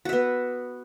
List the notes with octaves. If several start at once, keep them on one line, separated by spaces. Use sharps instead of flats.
B3 F#4 E5